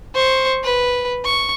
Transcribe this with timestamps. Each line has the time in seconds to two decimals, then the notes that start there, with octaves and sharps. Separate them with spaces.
0.15 C5 C#6
0.64 B4
1.25 C#6